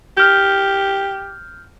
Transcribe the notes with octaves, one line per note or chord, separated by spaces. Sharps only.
G4 F6 G6